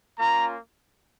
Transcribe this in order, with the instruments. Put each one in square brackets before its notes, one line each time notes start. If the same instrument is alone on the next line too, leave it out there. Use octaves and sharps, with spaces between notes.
[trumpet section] A#3 C#4 F4 A#5